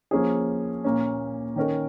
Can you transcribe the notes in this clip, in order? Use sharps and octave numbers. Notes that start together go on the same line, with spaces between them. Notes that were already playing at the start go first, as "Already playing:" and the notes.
F3 A#3 C#4 G#4
A#2 A#3 C#4
D#3 C#4 A#4